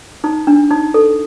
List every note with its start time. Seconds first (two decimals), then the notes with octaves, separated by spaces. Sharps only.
0.24 D#4
0.47 D4
0.71 D#4
0.94 A4